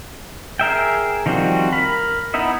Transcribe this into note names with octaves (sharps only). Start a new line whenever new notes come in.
G#4 A#4 E5 G5
D#3 F3 G3 C4 F#4
A#4 B5
B3 D#4 E4 E5